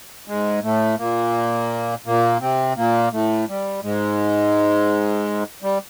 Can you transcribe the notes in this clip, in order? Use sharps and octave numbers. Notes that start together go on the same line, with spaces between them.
G#2 G#3
A2 A3
A#2 A#3
A#2 A#3
C3 C4
A#2 A#3
A2 A3
G3
G#2 G#3
G3